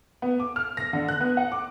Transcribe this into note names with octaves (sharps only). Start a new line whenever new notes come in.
B3
D6
F6
A#6
D3
F#6
B3
F#5
D6